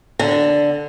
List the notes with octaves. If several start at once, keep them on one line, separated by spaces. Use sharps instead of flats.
D3